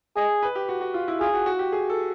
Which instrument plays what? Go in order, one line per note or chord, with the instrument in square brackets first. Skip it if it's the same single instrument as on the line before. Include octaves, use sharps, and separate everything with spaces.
[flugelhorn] G#4 [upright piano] D#5
[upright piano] B4
G4
F#4
F#4
F4
E4
[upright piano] F4 [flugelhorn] G#4
[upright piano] F#4
F#4
G4
G#4
A4